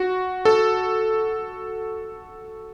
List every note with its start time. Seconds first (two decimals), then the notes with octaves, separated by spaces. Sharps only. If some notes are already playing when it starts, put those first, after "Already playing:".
Already playing: F#4
0.45 A4